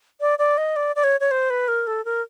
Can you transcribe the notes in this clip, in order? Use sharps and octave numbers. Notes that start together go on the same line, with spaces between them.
D5
D5
D#5
D5
D5
C#5
C#5
C5
B4
A#4
A4
A#4